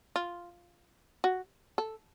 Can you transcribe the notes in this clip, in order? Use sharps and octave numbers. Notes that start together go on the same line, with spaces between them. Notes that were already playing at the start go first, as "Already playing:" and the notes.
F4
F#4
A4